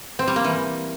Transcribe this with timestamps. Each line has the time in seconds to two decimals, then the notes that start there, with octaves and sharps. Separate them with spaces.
0.19 C4
0.27 G3
0.36 A#3
0.44 E3